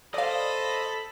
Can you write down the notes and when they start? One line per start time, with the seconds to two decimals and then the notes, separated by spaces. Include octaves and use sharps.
0.14 A4 C5 D5 D#5 F5 B5